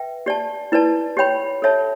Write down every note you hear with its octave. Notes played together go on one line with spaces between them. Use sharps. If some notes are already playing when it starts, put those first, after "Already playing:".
Already playing: B4 E5 G5
G4 D5 A5
E4 B4 D5 A5
G4 C#5 G5 B5
A4 C#5 E5 A5